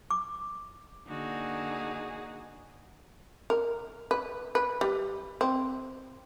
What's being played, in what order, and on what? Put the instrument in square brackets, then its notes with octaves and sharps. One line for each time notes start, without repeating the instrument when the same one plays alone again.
[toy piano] D6
[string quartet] D3 A#3 D#4 F#4 G#4
[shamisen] A#4
B4
B4
G3
C4